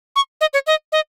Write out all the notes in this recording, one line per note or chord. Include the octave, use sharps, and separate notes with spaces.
C#6
D#5
C#5
D#5
D#5